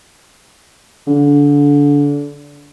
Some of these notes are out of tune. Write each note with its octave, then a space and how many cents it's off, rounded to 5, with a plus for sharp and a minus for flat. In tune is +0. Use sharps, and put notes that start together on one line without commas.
D3 -25